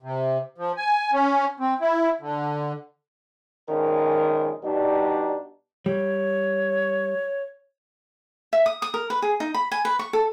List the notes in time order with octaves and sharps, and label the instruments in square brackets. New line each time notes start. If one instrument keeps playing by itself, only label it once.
[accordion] C3
F3
G#5
C#4
C4
E4
D3
[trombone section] A#1 D#3 G#3 C#4 A#4
B2 G3 D4 D#4
[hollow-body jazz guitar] G3 [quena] C#5
[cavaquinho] E5
D#6
D#6
A#4
B4
G#4
D#4
B5
G#5
B4
C#6
A4